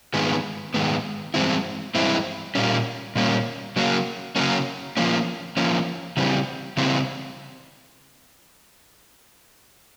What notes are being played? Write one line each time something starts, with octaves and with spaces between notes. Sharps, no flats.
G#2 D#3 G#3 B3
G#2 D#3 G#3 B3
G2 E3 G#3 C4 E4
G2 E3 G#3 C4 E4
A#2 G3 A#3 C#4
A#2 G3 A#3 C#4
C#3 F#3 A#3 C#4
C#3 F#3 A#3 C#4
F3 A#3 C#4
F3 A#3 C#4
C#3 E3 G3 C4
C#3 E3 G3 C4